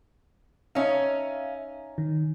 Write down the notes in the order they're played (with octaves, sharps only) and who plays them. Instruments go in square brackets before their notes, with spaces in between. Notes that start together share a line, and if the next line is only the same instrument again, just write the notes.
[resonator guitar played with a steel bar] C#4 D#4 [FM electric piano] E5 F5
[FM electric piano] D#3